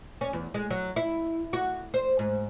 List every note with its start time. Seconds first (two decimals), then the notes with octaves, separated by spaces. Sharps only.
0.21 C#4
0.33 E2
0.54 G#3
0.70 F#3
0.96 E4
1.53 F#4
1.94 C5
2.19 G#2